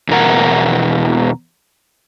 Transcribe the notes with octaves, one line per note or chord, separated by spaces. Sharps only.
E2 B2 A#4 F#5